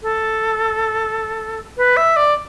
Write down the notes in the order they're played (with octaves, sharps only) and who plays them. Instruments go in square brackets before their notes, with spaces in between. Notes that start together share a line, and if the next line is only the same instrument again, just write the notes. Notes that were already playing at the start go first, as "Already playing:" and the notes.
[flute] A4
B4
E5
D5